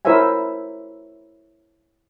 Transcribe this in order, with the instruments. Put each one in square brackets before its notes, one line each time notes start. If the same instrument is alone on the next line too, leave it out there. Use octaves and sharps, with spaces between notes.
[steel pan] E4 A#4 C5 C#5 E5 G#5